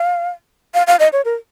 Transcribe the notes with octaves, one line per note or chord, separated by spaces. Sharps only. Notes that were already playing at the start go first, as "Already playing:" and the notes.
Already playing: F5
F5
F5
D#5
C#5
A#4